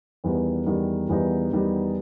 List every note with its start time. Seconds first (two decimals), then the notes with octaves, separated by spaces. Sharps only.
0.24 E2 D#3 G3 B3 D#4
0.66 E2 D#3 G3 B3 D#4
1.09 E2 D#3 G3 B3 D#4
1.51 E2 D#3 G3 B3 D#4